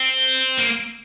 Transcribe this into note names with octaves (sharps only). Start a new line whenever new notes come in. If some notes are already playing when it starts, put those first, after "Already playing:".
Already playing: C4
A#3